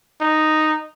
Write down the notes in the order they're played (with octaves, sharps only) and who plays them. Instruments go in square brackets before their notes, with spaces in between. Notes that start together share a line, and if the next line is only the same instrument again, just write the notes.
[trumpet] D#4